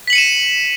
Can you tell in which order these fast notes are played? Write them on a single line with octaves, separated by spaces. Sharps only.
B6 F#7 C#7 D#7 E7